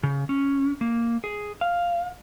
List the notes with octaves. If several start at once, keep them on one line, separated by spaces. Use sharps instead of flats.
C#3
C#4
A#3
G#4
F5